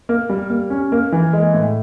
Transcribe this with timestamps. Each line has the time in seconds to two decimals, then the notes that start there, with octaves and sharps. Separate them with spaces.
0.09 A#3
0.30 G3
0.50 A#3
0.70 C#4
0.92 A#3
1.12 E3
1.33 G#3
1.54 A2